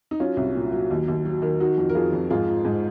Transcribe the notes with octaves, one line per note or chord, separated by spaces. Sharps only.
D#4
F#3 C#4 F4
C2
A#2
F#3
D#2
D#2
F#3
D#3
F#3 D#4 F#4
F2
A#4
F2 F4 G#4
F2
G#2 F4 G#4
F3
G#2